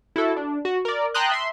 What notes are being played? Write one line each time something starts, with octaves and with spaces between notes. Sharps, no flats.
E4 F#4 A4
D4
F#4
A#4 D5
G5 A5 A#5 C6 D#6 F#6
E5 C6